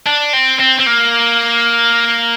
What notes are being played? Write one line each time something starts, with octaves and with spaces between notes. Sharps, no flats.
D4
C4
C4
C4
A#3